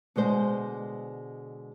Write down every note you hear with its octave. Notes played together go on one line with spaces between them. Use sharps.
B2 D3 G#3 C5